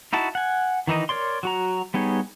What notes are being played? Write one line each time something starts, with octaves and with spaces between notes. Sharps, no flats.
D#4 E4 F#4 A5
F#5 G#5
D#3 E3 D#4 D#5
A#4 C#5 D5 C6
F#3 F#4 A#5
G3 B3 D#4 G#4 C#5